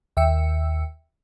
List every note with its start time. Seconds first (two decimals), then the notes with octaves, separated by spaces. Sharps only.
0.17 D#2 E5 G5 E6 C#7